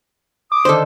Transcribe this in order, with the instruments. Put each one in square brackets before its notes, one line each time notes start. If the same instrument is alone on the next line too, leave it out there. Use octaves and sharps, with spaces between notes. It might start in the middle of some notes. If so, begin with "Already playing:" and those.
[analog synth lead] D6 [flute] D#6
[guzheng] D3 D#3 [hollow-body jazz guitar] A4 C5